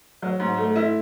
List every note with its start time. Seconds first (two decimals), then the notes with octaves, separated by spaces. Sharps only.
0.22 F#3
0.40 G#2
0.58 A3
0.76 E4